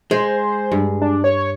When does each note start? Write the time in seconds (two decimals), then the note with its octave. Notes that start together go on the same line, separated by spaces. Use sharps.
0.11 G#3 C5
0.72 G2
1.02 D4
1.24 C#5